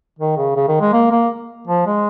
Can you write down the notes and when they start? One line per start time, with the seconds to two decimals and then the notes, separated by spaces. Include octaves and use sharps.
0.19 D#3
0.37 C#3
0.56 C#3
0.68 D#3
0.81 G#3
0.93 A#3
1.11 A#3
1.67 F3
1.86 G#3